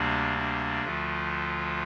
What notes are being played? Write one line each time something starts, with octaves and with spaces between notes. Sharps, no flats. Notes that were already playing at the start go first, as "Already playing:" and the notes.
Already playing: D2 C3 G3 A#3 D4
D4
D2 D3 F3 A3 F4